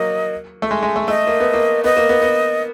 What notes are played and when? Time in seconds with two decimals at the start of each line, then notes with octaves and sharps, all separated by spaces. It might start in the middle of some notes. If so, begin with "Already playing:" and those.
Already playing: F#3 A#3 D#5
0.62 A3
0.71 G#3
0.83 G#3
0.96 A3
1.08 A3 D#5
1.27 A#3
1.40 B3
1.54 A#3
1.84 B3 D#5
1.97 A#3
2.09 B3
2.22 B3